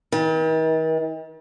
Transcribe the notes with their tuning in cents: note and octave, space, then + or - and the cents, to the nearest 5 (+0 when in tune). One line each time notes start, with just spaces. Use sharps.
D#3 +45